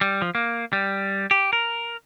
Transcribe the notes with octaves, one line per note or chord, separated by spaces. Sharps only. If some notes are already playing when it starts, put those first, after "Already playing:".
G3
F3
A#3
G3
G4
A#4